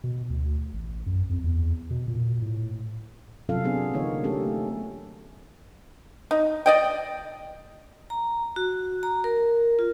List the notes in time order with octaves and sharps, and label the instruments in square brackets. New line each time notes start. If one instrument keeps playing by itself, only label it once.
[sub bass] B2
D2
A1
F#2
F2
E2
B2
A#2
A2
[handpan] C3 F#3 C#4 F4 A4 F5
B3 D4 G#4
D3 E3 A#3 B3 D#4 C#5
A3 C#4 G4 A4
[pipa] D#4
D5 D#5 G5
[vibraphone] A#5
F#4
A#5
A#4
F4